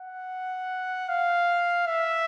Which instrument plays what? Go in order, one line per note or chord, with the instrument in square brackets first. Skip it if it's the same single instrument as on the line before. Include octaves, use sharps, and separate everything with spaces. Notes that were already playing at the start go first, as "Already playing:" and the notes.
Already playing: [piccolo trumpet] F#5
F5
E5